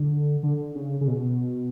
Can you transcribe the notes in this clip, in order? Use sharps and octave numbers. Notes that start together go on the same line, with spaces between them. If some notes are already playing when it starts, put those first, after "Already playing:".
Already playing: D3
D3
C#3
C#3
B2